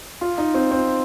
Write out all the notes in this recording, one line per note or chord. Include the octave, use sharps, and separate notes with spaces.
F4
D#4
C4
C4